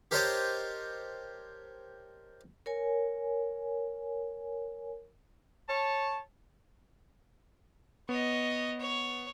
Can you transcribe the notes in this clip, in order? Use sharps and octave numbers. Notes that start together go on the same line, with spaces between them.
G4 A#4 C5 C#5 D#5 A5
A#4 C#5 G#5
C#5 A5
B3 C#5 D#5
C#5